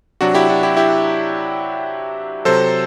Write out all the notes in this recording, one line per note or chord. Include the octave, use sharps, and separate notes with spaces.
C3 F#3 D4 F#4
E4 G4
D4 F#4
E4 G4
E4 G4
C3 F#3 A4 C5